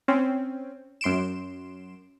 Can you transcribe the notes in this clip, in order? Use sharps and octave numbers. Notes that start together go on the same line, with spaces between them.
C4 C#4
F#2 C6 D7 E7